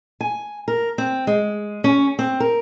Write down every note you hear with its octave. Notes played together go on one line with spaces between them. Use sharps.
G#5
A#4
C4
G#3
C#4
C4
A#4